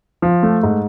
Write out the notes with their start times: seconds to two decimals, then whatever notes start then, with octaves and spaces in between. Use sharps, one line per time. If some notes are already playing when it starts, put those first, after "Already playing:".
0.22 F3
0.43 A3
0.63 G#2